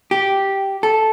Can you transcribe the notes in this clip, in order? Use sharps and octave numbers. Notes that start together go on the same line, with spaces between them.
G4
A4